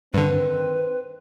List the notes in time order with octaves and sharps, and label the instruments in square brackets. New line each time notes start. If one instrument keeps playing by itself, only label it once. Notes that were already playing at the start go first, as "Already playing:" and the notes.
[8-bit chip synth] G2 D3 [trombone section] D#3 C4 [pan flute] B4